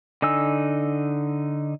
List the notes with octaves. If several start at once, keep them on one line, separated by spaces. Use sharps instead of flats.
D3 D#4 G#5 E6